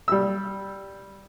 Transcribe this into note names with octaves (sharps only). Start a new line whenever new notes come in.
G3 E6